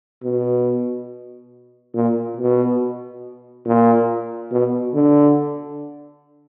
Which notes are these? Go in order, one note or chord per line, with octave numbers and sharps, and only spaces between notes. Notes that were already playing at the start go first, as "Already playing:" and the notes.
B2
A#2
B2
A#2
B2
D3